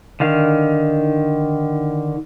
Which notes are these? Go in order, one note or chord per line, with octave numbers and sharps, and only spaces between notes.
D3 D#3 F5